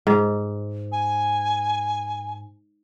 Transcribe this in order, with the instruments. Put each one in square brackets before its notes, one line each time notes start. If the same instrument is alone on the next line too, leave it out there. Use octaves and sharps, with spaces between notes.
[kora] G#2
[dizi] G#5